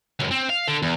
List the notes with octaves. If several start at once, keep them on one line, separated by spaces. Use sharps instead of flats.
C#2 F#2
C4
F5
D3
E2